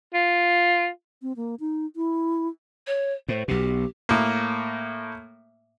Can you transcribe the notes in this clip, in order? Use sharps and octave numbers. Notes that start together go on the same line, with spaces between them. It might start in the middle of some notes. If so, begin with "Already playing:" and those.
F4
C4
A#3
D#4
E4
C#5
A2 C5
B1 B2 G4
A2 A#3